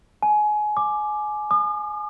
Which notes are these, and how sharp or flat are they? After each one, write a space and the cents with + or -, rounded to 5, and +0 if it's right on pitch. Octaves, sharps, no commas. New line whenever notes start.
G#5 +25
D6 +10
D#6 -45